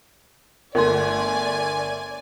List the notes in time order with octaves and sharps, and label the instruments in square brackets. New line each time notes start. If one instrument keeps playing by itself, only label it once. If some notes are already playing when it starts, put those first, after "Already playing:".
[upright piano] G1 A3 [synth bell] A#4 C6 [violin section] D5 G#5